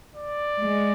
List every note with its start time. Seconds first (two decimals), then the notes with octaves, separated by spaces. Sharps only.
0.15 D5
0.59 G#3